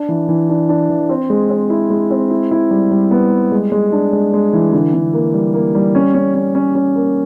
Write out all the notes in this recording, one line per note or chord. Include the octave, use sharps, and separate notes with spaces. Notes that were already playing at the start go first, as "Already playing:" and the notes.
Already playing: D4
E3
E3
D4
D4
E3
C4
G#3
C4
E4
G#3
C4
E4
E4
G3
G3
B3
G3
G#3
G#3
D4
G#3
G#3
E3
D3
D3
A#3
G3
A#3
G3
C#4
C#4
C#4
C#4
C#4
A#3